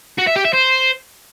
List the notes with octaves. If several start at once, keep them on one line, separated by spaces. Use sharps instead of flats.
F#4
E5
G4
E5
C5